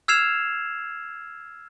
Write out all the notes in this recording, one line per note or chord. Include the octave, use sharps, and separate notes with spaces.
E6 F6 G#6 C7 E7 F7